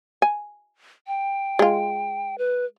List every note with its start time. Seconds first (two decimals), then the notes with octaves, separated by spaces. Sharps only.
0.22 G#5
1.07 G5
1.59 G#3 F4
2.38 B4